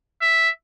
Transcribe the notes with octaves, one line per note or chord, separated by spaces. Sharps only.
E5